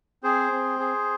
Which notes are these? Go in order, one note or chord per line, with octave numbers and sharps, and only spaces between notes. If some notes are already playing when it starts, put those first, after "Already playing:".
C4 G#4 C5
C4
G#4